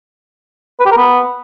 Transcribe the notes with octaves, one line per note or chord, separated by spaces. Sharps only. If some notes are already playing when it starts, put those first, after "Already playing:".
B4
G4
A#4
B3